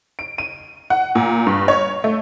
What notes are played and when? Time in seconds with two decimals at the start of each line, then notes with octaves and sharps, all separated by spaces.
0.19 D7
0.38 D#7
0.90 F#5
1.15 A#2
1.47 G2
1.68 C#5
2.04 A3